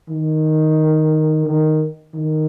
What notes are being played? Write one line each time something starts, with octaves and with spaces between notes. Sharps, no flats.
D#3
D#3
D#3